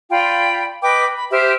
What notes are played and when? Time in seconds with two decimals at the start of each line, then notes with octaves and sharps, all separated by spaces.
0.11 F4 D5 G5 B5
0.82 B4 D#5 G5 D6
1.15 B5
1.31 G4 C5 E5 F6